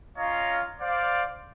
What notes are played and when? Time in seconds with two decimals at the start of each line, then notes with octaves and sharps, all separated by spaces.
0.17 C#4 F4 C#5 D#5 F5 A#5
0.81 C5 D5 F5